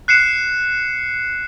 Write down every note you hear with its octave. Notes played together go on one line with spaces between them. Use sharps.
F#6 C7 C#7 E7